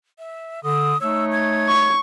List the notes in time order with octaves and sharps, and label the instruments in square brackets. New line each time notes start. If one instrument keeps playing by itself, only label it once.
[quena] E5
[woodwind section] D3 [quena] D#6
[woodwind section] A3 D#4 C#5 [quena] E6
[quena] G#6
[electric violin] C#6